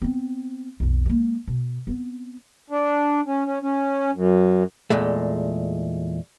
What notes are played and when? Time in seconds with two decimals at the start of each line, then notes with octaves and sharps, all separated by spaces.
0.02 B3 C4
0.80 B1 F2
1.06 G#3 A#3
1.47 B2
1.87 B3 C4
2.70 D4
3.27 C#4
3.45 C#4
3.62 C#4
4.14 F#2
4.90 E2 A#2 G#3 A3